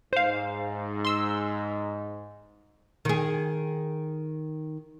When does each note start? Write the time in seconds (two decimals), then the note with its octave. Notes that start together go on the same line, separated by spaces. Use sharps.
0.13 G#2 C5 F5
1.05 C6 E6
3.05 D#3 G#4